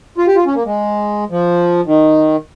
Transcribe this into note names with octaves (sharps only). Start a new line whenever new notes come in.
F4
G4
F4
C#4
A#3
G#3
F3
D#3